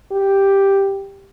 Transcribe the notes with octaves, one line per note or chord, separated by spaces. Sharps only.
G4